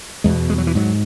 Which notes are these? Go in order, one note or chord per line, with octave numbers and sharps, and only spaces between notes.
E2 B2 G#3
G#3
F#3
E3
G#2 F#3